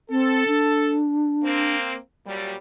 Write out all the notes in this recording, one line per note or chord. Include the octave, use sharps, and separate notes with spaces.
C4 A4
D4
A#3 C4
A#2 F#3 G3